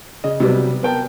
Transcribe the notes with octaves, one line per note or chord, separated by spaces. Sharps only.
C#3 D#5
C3 F#3 G3 B3
B3 A#4 G5 A5